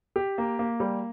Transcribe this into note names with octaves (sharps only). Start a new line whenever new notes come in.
G4
A#3
A#3
G3